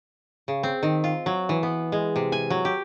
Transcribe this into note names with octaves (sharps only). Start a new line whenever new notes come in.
C#3
C4
D#3
F4
F#3
E3
B3
G#3
C3
G#5
F#3
G4